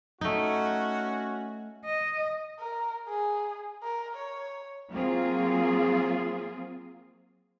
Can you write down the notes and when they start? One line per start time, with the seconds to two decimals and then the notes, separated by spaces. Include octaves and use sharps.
0.21 A3 C#4 D#4 F#4
1.85 D#5
2.60 A#4
3.09 G#4
3.83 A#4
4.17 C#5
4.92 F#3 A#3 C4 F4 G#4